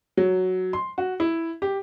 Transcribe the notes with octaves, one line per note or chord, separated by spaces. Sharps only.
F#3
C6
F#4
E4
G4